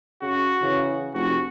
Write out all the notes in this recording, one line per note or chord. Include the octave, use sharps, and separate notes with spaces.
C#3 F#4
C#3 E3
F1 F#4